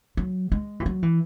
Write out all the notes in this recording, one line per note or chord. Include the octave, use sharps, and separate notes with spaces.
F#3
G#3
E3
F#3
E3